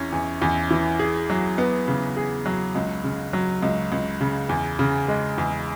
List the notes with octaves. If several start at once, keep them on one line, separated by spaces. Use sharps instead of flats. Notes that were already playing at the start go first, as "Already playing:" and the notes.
Already playing: E2 E3 C#4
E2
E2
E3
G#4
F#3
B3
C#3
G#4
F#3
C#2
C#3
F#3
C#2
C#2
C#3
E2
C#3
G#3
E2